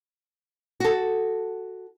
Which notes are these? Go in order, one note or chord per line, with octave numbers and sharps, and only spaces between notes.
F#4 A4